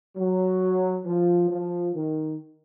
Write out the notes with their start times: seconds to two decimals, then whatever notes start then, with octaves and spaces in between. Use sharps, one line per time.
0.17 F#3
1.06 F3
1.50 F3
1.96 D#3